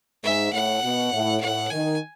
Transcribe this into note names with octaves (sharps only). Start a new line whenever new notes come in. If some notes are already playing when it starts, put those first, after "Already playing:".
G#2 E5
A2 F#5
B2
A2
A2 F#5
D#3 G#5